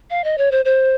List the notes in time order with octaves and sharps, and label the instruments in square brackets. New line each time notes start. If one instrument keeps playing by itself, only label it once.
[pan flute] F5
D#5
C#5
C5
C5